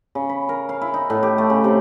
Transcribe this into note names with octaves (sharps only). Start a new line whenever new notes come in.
C#3
B5
A#4
F5
E4
D#4
A2
G4
A3
C#3
C3